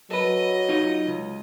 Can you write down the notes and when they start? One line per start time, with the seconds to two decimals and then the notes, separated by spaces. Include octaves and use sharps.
0.11 F#3 A4 B4 D#5
0.69 D#4 F4 C#5
1.07 C#2